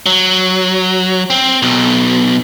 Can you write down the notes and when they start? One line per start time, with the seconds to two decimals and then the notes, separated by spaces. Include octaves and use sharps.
0.06 F#3
1.30 C4
1.63 B1 B2